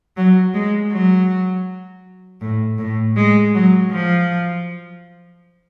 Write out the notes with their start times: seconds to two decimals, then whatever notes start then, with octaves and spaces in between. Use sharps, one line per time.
0.17 F#3
0.54 G#3
0.91 F#3
2.41 A2
2.79 A2
3.16 G#3
3.54 F#3
3.91 F3